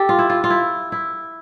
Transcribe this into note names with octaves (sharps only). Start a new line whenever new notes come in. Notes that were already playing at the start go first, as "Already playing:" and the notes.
Already playing: G4 A4
F4
E4
F4
F4
E4
E4